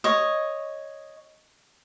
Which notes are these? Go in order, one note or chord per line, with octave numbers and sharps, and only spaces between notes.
C#5 D#5